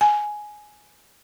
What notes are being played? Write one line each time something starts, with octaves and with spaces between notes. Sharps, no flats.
G#5